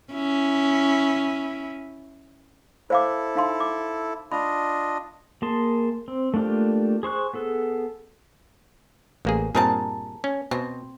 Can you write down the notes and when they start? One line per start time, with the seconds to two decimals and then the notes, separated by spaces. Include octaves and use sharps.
0.13 C#4 E4
2.90 E4 A4 C5 F5 D6
3.35 D#4 F5 C6
3.60 D6
4.32 D4 F4 D#5 B5
5.42 A#3 G#4 A5 C6
6.08 C4
6.34 A3 A#3 D4 F4 G4
7.03 G#4 C5 C#6 F#6
7.34 B3 G#4 A4
9.25 A1 A#3 G#4
9.55 G2 A#2 C4 G#4 A#4 A5
10.24 C#4
10.51 B2 C4